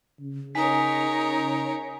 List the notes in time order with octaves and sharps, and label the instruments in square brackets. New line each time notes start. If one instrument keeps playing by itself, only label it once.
[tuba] C#3
[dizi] D#4 [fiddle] A#4 C#5 [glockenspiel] G#5 B6